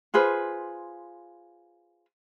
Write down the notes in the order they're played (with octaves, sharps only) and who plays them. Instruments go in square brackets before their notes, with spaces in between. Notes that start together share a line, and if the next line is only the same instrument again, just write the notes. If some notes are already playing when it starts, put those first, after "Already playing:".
[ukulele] F4 G#4 B4 C5